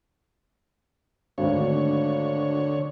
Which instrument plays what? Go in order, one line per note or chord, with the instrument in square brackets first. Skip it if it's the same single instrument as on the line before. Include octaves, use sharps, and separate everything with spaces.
[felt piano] G#1 D2 [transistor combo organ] D3 C#5